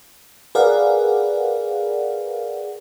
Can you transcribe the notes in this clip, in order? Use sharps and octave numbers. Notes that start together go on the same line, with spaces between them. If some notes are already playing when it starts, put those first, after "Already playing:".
G#4 A#4 B4 D5 F5 F#5